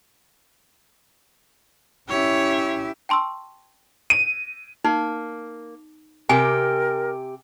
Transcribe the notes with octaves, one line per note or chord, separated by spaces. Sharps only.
C#4 E4 G4 C#5 E5
G5 A5 C6 C#6 E6
D#7
A#3 D#4
C3 G4 A#4 G#5